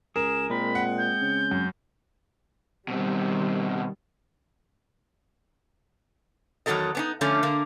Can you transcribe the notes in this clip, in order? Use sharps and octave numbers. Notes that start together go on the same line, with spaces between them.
C#2 G#4 A#4 E7
A#2 G#3 C4 B5
F#5
G6
C#3
F#2
B2 D#3 G3 C4
E2 D#3 F#3 E4 A4 D#5
B3 C#4 D#4
D3 F3 A3 C#4
D3 A#3